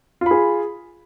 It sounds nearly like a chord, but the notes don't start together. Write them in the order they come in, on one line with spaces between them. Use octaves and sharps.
F4 B5 G#4